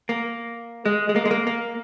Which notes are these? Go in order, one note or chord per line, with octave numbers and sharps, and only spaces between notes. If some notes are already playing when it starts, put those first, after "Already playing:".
A#3
G#3
G#3
A#3
G#3
A#3
A#3